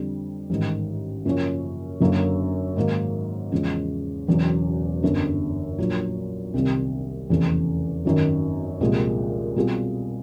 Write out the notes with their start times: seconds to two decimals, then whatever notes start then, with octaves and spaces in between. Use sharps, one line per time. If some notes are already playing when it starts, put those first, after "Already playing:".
Already playing: F2 D3 G3
0.50 A1 G#2 D#3
1.25 F#2 C#3 F3 A#3 C#4
2.01 F#1 F#2 D3 F#3 A#3
2.76 G#2 D#3 F#3 A#3
3.52 E2 C#3 F3 G#3 C#4
4.27 E1 E2 C#3 F#3
5.03 G1 F#2 D3
5.78 A#1 A#2 F#3
6.54 C2 C3 D#3 G3 C4
7.29 F1 E2 C#3 E3 A3
8.05 G#1 F#2 D#3
8.80 C2 A#2 F3 G#3
9.56 B2 G3 C4 F4 G#4